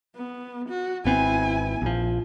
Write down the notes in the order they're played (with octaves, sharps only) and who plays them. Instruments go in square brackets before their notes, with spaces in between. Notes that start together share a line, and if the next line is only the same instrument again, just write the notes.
[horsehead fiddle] B3
F#4
[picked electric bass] G#1 B3 C4 [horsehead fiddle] E4 G#5
[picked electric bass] A#1 F3